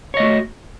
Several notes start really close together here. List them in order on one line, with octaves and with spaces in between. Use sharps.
C#5 D#5 A3 F#4